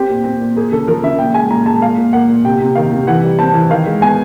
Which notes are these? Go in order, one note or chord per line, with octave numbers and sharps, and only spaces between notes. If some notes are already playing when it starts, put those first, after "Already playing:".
Already playing: C4 G4
A#2
C4
A#2
A#3 G#4
C#3 A4
F3 A#4
C#3 E5
A#2 G5
G#3 G#5
A#2 A#5
G#3 A5
A#2 F5
A#2
A#3 F#5
A#2
C3 G5
C3
D#3 F5
C3
E3 F#5
G3
C4 A5
E3
D#3 F5
G#3
B3 G#5